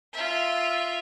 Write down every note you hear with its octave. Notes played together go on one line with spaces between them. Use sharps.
F4 E5